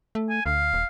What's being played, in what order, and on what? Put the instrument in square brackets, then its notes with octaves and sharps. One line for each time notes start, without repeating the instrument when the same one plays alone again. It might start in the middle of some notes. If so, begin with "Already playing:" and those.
[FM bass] A3
[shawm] G#5
[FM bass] D2 [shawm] F5
[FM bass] D#1